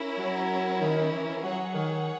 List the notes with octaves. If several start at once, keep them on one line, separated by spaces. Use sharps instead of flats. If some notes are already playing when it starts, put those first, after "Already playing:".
Already playing: C#4 E4 A#4
F#3
D#3
E3
F#3 G#4 C#5 F#5
D#3